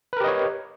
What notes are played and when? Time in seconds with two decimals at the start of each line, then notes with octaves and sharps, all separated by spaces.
0.13 B4
0.17 A#4
0.20 G4
0.24 D#5
0.28 C#5